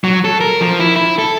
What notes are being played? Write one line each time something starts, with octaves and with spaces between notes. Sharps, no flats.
F#3
A4
A#4
F3
E4
E4
A4